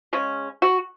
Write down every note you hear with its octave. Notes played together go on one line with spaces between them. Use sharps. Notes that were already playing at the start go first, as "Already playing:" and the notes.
C#3 G#3 C#4
F#4